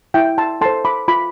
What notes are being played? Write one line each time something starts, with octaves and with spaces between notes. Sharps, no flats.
E4 E5 G5
A5 C6
A4 C5 A5 C6
B5 D6
F4 B5 D6